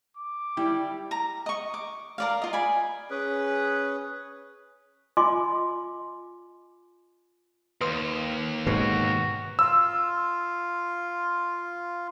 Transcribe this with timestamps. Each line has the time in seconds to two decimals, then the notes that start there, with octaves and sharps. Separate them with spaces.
0.17 D6
0.57 G3 E4
1.11 A#5
1.46 D#5 C#6
1.74 D6
2.18 A#4 D5 F5
2.42 F4 D#5
2.53 D5 G#5 B5
3.11 C#4 G#4 B4
5.17 F4 D#5 G#5 C6 D6
7.81 D#2 B4 C6 D#6
8.67 G#2 B2 F#4 B4
9.59 F4 E6